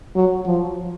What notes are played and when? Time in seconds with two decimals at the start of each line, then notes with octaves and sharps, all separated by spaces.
0.15 F#3
0.46 F3